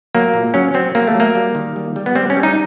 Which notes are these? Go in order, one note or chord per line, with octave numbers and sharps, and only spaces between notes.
F#3 A#3
A#2
F#3 C#4
F#3 C4
F#3 A#3
A3
F#3 A#3
G3
D#3
G3
G3
B3
G3 C4
C#4
G3
D#4